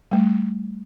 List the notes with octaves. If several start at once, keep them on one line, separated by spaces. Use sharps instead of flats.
G3 A3